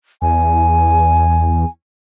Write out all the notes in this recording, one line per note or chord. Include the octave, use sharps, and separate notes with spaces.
E2 G#5